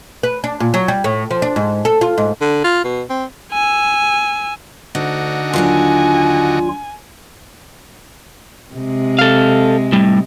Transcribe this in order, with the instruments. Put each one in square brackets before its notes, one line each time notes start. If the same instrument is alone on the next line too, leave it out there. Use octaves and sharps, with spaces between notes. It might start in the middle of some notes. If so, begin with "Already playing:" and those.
[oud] B4
D4
A#2
F#3
G3
A2
F3
D4
G#2
A4
F4
G#2
[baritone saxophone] D3
F4
B2
C4
[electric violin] G#5 E6
[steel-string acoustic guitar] D2 [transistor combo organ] D3 D#4 F#4
[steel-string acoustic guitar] D#2 F#3 D4 [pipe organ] F4 [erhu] G#5
[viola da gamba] C3 G#3
[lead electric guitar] A4 F5
A2 G3